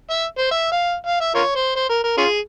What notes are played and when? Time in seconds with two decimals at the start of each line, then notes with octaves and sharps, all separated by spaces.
0.10 E5
0.38 C5
0.51 E5
0.72 F5
1.07 F5
1.21 E5
1.35 F4 A#4 C#5
1.55 C5
1.76 C5
1.89 A#4
2.04 A#4
2.18 C#4 F4 G#4